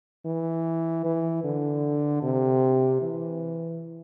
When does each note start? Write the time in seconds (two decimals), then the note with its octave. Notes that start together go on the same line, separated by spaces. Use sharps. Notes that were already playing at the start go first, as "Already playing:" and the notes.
0.25 E3
1.04 E3
1.44 D3
2.22 C3
3.01 E3